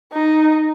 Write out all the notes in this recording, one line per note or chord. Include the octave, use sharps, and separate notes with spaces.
D#4